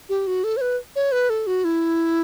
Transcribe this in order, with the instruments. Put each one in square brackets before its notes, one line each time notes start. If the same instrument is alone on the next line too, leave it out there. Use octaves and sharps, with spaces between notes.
[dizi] G4
F#4
A4
C#5
B4
C#5
B4
A4
F#4
E4